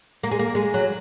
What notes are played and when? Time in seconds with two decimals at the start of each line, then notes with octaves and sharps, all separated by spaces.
0.23 A#3
0.31 G#3
0.39 A#3
0.55 G#3
0.74 F#3